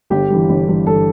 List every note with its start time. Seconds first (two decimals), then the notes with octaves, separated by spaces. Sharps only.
0.10 G1 G4
0.30 G2 E3
0.49 G1
0.68 G2 E3
0.86 G1 A4